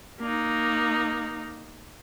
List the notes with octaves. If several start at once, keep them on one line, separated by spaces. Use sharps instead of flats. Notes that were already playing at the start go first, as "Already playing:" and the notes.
A#3 D#4